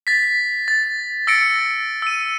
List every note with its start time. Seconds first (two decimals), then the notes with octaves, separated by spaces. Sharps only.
0.07 A6 B6
0.68 A6
1.27 E6 A6 A#6 C#7 D7
2.02 E6 D#7